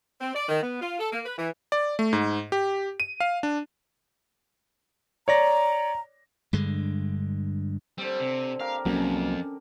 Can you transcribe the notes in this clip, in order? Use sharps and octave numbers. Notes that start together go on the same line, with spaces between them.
C4
D5
D#3
B3
F4
A4
A#3
B4
E3
D5
A3
G#2
G4
D#7
F5
D4
C#5 D5 A#5 A#6
G2 D3 G#3
D3 G3 C4
C3
G4 A#4 F5 D6
C2 F2 F#3 A#3 C#4